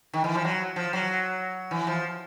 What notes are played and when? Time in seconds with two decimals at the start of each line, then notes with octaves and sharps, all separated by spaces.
0.13 D#3
0.24 E3
0.35 F3
0.44 F#3
0.76 F3
0.93 F#3
1.71 E3
1.87 F3